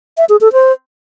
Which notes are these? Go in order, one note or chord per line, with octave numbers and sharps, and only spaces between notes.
E5
G#4
A4
C5